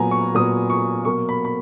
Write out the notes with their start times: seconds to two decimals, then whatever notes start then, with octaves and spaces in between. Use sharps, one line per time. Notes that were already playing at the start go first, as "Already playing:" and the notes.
Already playing: A#2 F#3 B3 G#5 A#5
0.11 C#6
0.35 A#2 F#3 B3 D#6
0.70 C#6
1.05 B2 F#3 A#3 C#6
1.29 B5
1.45 B5